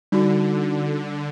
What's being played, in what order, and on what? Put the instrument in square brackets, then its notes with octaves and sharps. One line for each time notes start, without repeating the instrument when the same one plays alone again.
[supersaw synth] D3 [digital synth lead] G3 [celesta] D#4 F#4